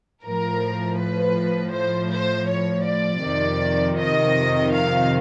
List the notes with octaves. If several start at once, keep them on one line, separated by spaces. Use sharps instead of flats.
A2 F3 A#4
B4
C5
C5
C#5
D5
F2 C3 D#3
D#5
F5